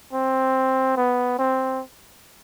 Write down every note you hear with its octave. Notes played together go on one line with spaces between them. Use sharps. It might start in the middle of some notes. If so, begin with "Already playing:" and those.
C4
B3
C4